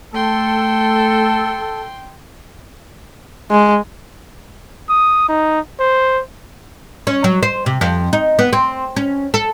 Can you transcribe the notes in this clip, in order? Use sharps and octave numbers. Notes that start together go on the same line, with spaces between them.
A3 A4 G5 C6
G#3
D#6
D#4
C5
C#4
F#3
C5
C3
F2
D#4
B3
C4
C#4
A4